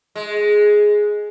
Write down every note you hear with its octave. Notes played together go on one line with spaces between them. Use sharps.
G#3